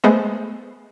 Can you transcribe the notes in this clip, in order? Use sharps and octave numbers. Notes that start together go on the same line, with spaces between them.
G#3 A3 B3 C5 D#5